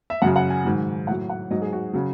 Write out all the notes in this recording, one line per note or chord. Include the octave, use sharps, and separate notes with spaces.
E5
F#2 C#3 F#3 F#5
F#5
G#5
G#2 D#3 F#3
A2 F#3 F#5
F#5
G#2 F#3 D#5
G#4
F#4
C#3 F#3